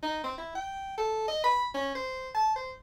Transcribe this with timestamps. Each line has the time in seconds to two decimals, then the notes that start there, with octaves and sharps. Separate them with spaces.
0.03 D#4
0.24 C4
0.38 E4
0.55 G5
0.98 A4
1.28 D#5
1.44 B5
1.74 C#4
1.95 C5
2.35 A5
2.56 C5